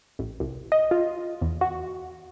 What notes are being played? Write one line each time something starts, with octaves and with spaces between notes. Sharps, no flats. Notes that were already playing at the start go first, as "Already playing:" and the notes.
A1
C2
D#5
F4
E2
F#4